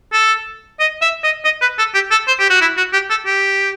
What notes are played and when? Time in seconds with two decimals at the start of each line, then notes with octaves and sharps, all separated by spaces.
0.13 A4
0.80 D#5
1.02 E5
1.23 D#5
1.45 D#5
1.61 B4
1.78 A4
1.94 G4
2.11 A4
2.27 C5
2.39 G4
2.50 F#4
2.61 E4
2.77 F#4
2.93 G4
3.10 A4
3.26 G4